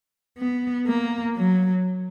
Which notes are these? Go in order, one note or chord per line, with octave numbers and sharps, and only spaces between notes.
B3
A#3
F#3